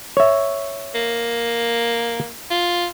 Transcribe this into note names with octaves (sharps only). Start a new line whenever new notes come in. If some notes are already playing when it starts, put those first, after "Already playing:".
C#5 E5
A#3
F4